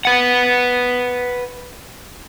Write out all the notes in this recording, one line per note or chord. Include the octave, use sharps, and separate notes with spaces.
B4 F#5